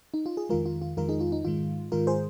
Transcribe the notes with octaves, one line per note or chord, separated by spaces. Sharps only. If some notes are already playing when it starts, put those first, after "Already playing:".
D#4
F4
G#4
F2 D#3 G#3 F4 A#4
F4
F4
F2 D#3 G#3 F4 A#4
D#4 G#4
F4
D#4
G#2 D#3 G#3 F4
G#2 D#3 G#3 F4 A#4
G#4 C5